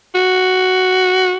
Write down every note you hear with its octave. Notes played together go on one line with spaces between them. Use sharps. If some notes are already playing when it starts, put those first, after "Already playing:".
F#4